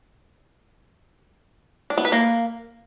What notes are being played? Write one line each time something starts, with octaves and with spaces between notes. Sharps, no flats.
D4
B3
B4
A#3